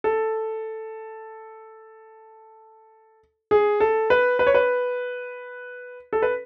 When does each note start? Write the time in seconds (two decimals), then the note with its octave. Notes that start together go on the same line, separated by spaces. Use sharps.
0.04 A4
3.51 G#4
3.80 A4
4.10 B4
4.39 B4
4.47 C#5
4.54 B4
6.13 A4
6.22 B4